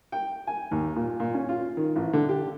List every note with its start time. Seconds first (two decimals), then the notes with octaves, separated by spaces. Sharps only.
0.12 G5
0.47 G#5
0.71 D#2
0.96 A#2
1.20 A#2
1.34 C#4
1.49 F4
1.77 D#3
1.96 A1
2.13 D3
2.29 G4